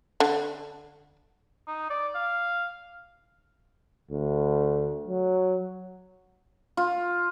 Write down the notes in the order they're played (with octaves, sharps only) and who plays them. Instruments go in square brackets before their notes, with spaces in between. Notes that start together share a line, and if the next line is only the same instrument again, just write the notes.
[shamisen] D3
[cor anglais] D#4
D5
F5
[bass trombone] D2
F#3
[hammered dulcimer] F4